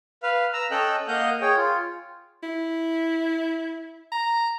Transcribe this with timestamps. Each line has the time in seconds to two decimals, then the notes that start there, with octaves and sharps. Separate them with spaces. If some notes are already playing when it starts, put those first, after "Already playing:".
0.23 B4 F5
0.53 A#5 E6
0.71 C#4 A4 D#5 G5 E6 F#6
1.08 A#3 D#5 F5 F#5 D#6 G6
1.41 G#4 C#5 G5
1.56 F4
2.43 E4
4.12 A#5